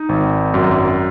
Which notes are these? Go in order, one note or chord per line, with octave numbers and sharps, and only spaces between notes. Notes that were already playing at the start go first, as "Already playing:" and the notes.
Already playing: D#4
G#1
F#2